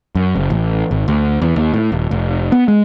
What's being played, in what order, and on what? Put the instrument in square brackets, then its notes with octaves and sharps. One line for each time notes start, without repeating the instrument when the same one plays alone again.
[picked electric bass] F#2
F#1
A1
G#1
D2
E2
D#2
A2
D#1
F1
B3
G#3